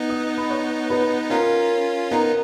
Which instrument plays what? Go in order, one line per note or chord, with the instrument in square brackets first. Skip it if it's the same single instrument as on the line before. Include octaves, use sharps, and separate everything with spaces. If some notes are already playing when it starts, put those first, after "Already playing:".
Already playing: [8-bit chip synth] B3 D#4
[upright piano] D#5 D#6
B5
C#5 C#6
B4 B5
[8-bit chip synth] C#4 F4 [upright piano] A#4 A#5
[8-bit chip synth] B3 D#4 [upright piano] A#4 A#5